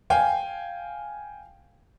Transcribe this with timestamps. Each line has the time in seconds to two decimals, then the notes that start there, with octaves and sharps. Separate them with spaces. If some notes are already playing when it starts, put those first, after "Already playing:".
0.10 F5 G5 G#5